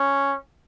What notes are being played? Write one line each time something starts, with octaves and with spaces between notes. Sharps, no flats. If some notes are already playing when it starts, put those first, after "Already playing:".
Already playing: C#4